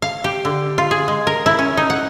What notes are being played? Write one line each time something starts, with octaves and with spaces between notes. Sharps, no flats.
F5
G4
D3
F4
G#4
G#3
A#4
E4
C#4
D#4
F#5